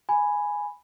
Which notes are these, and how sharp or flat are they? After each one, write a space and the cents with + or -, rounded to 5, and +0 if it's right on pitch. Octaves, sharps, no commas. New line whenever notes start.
G#5 +0 B5 +0